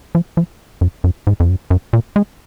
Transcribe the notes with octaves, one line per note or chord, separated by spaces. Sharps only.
F3
F3
F#2
F#2
G#2
F2
F#2
F#2
A#2
G#3